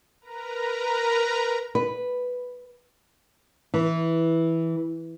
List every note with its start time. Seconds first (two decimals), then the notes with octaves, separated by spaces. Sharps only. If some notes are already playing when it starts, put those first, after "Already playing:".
0.21 A#4 B4 A#5
1.75 B4
3.74 E3